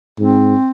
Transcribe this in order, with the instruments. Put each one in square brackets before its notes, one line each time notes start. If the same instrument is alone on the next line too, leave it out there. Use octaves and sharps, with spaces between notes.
[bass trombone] G#2 [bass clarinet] C4